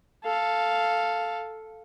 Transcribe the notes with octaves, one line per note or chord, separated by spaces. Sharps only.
A4 F5